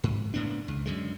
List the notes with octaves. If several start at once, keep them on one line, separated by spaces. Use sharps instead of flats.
G#2
F#1 A2 B3 D4
C#2
F#2 D3 G#3